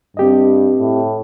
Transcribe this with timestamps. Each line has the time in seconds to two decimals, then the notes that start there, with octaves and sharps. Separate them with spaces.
0.17 G2 C4 G4 D#5
0.77 A2